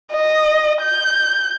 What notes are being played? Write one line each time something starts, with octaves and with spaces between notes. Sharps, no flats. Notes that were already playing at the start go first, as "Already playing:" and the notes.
D#5
G6